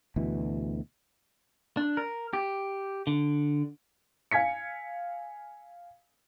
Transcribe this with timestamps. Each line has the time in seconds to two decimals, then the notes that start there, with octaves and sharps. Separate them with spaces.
0.16 D2 B2 E3
1.77 D4
1.97 A#4
2.33 G4
3.07 D3
4.31 F5 G#5 G#6 B6 C#7